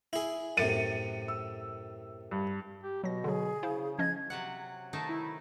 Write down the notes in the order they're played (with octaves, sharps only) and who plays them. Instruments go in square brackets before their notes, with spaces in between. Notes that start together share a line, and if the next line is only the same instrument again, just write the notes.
[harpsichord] E4 G#4
[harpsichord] F#2 A2 C3 [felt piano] A6 C#7 D#7
[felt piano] E6
G2
[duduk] G4
[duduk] B2 [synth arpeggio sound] F#3 A#6
[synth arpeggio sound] D3 F#3 [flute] G#4
[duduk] C#3 [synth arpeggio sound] E4 C5 F5
[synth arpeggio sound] F3 C#4 D#5 [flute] G#6
[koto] C3 F#3 F#5
[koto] D#3 A3 D#4 [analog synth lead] A5
[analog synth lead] E4